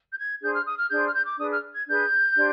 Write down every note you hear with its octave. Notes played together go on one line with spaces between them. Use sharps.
G6
G#6
D4 G#4 C5 G6
F6
D#6
F6
D4 G#4 C5 G6
F6
G6
D6
D4 G#4 B4 D#6
F6
G#6
D4 G#4 B4 G6
D4 G4 C5